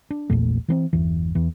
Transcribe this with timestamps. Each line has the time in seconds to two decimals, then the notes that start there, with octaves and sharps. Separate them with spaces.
0.10 D4
0.30 A#1 E2 A#2 A3
0.68 E3 B3 C4
0.93 G1 E2 E3
1.35 E2 E3